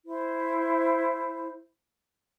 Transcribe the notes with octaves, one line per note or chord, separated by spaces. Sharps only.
E4 C5